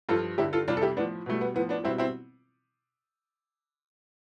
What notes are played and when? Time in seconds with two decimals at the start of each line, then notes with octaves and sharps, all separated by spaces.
0.09 G2 F3 F4 A4
0.38 G2 D3 G3 E4 G4
0.53 F4 A4
0.68 F2 C3 G3 D4 F4
0.77 A4
0.82 E4 G4
0.96 A2 B3 D4
1.00 F3
1.26 B2 G3 A3
1.41 B3
1.55 A2 F3 B3
1.69 B3 D4
1.84 B2 G3 C4 E4
1.98 C4 E4